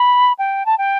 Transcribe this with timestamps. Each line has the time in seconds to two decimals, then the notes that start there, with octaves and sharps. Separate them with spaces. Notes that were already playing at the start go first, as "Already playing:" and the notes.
Already playing: B5
0.39 G5
0.66 A5
0.78 G5